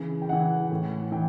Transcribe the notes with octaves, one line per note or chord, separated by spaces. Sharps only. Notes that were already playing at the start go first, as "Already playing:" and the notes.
Already playing: C#3 E3
G5
C#3 E3 F#5
A2 E3
E3 G5